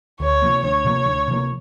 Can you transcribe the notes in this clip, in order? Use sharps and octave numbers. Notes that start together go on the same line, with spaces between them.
D2 C#5
C3 F3 A#3
D2 C#5
C3 F3 A#3
D2
C3 F3 A#3